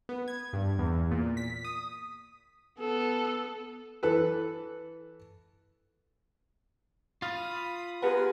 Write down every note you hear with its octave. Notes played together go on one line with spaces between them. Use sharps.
B3
G#6
G2
E2
A#2
B6
D#6
B3 A4
E3 A4 B4
F4 F5 B5 D#6 A6
B3 G4 G#4 A#4 B4 F#5